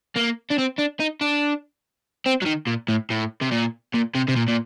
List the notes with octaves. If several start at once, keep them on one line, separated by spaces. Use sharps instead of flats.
A#3
D4
C4
D4
D#4
D4
C4
F#3
D#3
A#2
A2
A2
C3
A#2
A#2
C3
C3
A#2
A#2